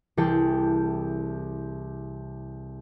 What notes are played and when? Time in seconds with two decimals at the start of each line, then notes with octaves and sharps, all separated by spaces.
0.17 C2 E3 G#4 G5 A5 C#7